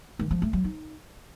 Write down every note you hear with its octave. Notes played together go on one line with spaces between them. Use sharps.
D#3
F3
A3
F#3
D#4